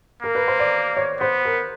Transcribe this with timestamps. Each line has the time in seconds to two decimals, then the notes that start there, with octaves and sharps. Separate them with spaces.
0.23 A#3 A#4
0.35 B4
0.48 C5
0.59 D5
0.97 C#5
1.20 B3 C5
1.45 A#4